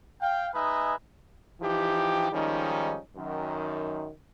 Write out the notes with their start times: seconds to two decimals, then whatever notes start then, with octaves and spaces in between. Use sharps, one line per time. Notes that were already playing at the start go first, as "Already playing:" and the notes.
0.21 F5 G5
0.54 G#3 D#4 B4 E5 G#5 D#6
1.61 E3 F3 D#4 G4
2.32 D#3 F3 G3 G#3 C#4 D#4
3.16 F#2 D#3